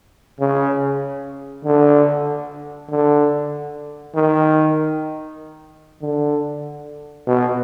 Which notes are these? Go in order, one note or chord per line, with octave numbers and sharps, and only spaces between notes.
C#3
D3
D3
D#3
D3
B2